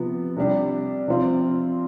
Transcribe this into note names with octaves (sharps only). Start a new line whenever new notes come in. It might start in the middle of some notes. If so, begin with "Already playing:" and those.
Already playing: C3 F3 B3
C3 G3 D4 G4
C3 F3 C4 F4